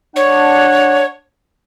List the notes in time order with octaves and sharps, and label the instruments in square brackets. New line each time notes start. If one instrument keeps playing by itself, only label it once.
[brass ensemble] D4 F#5 [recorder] C#5